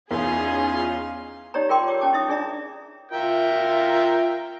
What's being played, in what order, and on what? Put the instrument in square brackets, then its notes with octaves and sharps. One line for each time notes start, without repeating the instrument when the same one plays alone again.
[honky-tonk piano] E2 [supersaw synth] C#4 D#4 F4 [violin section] G#4 [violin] F5 C6
[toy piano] D#4 G4 C#5 D5 A#5
F4 G#4 A#4 G5 C6 D6
G4 C#5 D6
C#4 G5 A5 D6
D#4 E4 E5 D#6
D4 G#4 D5 E5 A#5
[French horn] F4 [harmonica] A#4 E5 G5
[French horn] F4